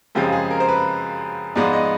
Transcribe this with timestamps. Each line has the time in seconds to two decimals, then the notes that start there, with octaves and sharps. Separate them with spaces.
0.15 F#2 C#3 F3 G#3 C4 G4
0.32 G#4
0.51 A#4
0.60 C5
0.68 B4
1.55 G#2 F3 G#3 B3 D5
1.73 D#5